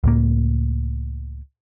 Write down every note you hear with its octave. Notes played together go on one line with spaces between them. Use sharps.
C#2 A2 A#3